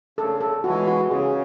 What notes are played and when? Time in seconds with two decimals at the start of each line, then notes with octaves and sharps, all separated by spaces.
0.18 C#3 A4
0.41 A4
0.64 E3 G#3 F#4
0.88 F#4
1.10 C#3 G#4